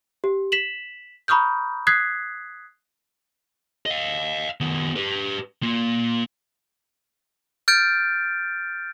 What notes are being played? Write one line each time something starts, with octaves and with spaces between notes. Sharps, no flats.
G4
B6 E7 F#7
A#5 B5 C#6 D#6 F6 G6
D#6 F#6 G#6 B6 C7
D#5 F5
D#3 B3
G4 B4
A#3 F4
F6 G6 A6 D7